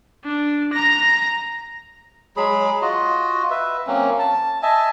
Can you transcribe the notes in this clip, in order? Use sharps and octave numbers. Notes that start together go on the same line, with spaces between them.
D4
A#5 A#6
F#3 G#3 G#4 B5
F4 F#4 D#5
B4 E5
F#3 A#3 C4 C#4
A5
D#5 E5 G#5 A5